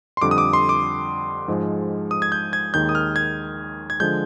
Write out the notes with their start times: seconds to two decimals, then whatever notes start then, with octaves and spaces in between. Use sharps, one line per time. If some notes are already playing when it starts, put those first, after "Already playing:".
0.17 C6
0.22 F2 D3 G3 D6
0.31 D#6
0.38 D6
0.53 C6
0.69 D6
1.48 G#2 F3 G#3
2.11 D#6
2.22 G#6
2.32 G6
2.53 G#6
2.74 D#2 D#3 G#3 G6
2.89 D#6
2.95 F6
3.16 G#6
3.90 G#6
4.00 D3 F3 G#3 G6